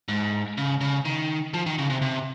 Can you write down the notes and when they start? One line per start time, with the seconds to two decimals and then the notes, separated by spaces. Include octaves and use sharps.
0.08 G#2
0.58 C#3
0.81 C#3
1.05 D#3
1.54 F3
1.66 D#3
1.78 C#3
1.90 C3
2.02 C3